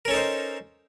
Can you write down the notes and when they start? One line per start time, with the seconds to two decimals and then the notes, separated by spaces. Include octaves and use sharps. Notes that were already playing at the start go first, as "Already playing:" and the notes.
0.05 A#4
0.08 C#4
0.11 A4
0.13 D#4
0.16 C5